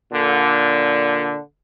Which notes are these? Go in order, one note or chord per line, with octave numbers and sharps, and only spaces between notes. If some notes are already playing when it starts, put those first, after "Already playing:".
A#2 D3